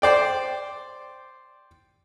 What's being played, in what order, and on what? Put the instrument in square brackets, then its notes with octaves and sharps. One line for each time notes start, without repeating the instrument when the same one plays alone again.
[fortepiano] C5 D5 G5